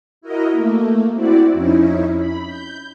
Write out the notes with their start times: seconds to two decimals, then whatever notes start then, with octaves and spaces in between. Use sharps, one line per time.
0.21 E4 F#4 A#4 D#5
0.52 A3 A#3
1.13 C4 E4 F#4 D5
1.53 F2 C#4 D#4 E4
2.17 B5
2.47 G6